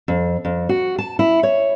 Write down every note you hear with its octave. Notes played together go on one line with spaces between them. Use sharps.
F2
F2
F#4
A5
E4
C#5